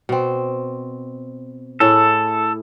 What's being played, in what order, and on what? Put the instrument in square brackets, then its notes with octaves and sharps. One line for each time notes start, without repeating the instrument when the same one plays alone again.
[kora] B2 C4
[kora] A2 E4 G#4 [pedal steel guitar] A4